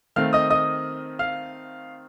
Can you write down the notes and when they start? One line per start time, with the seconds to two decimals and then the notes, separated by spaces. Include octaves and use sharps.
0.16 D#3 A3 C4 F5 F6
0.33 D#5 D#6
0.50 D#5 D#6
1.19 F5 F6